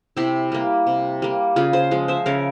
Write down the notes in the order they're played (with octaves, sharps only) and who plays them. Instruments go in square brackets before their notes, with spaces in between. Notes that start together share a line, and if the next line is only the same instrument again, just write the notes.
[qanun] C3 E4 G4
G3 A#3
C3
G3 A#3
C#3 F4 G#4
G#4 C5
F3 G#3
C5 E5
C#3 A#4 C#5